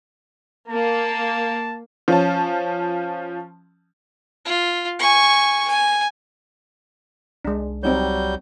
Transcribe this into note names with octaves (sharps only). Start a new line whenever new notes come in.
A#3 A5
F3 C#4 A5
F4
G#5 C#6
G#5
C2 G#3 D4
F#3 G3 C4 D#4 C#5 G6